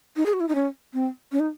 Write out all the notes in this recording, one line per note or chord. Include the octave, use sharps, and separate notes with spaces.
D#4
G#4
F#4
E4
D#4
C#4
C4
C#4
D#4